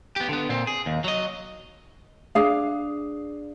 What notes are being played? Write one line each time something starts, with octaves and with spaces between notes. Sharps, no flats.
B3 G4
D3 B3
A#2 C4
G#4
D#2
F#3 D#5
D4 G#4 F5